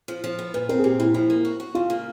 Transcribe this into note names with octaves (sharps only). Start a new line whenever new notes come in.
F3
F3
B3
A#2 B4
C4 A#4
G#4
A#2 G4
A#2 E4
F3 E4
A#3
F#4
F#4
C#3 F4
A#3